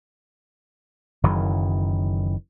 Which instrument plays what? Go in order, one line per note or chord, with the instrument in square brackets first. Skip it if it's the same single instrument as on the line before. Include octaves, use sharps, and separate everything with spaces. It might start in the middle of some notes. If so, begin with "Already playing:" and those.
[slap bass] F#1 F#2 D#3 E3